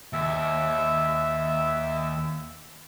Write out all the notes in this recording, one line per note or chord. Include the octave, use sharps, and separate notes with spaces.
D#2 E5